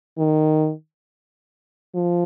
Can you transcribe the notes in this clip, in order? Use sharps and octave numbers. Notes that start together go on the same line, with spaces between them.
D#3
F3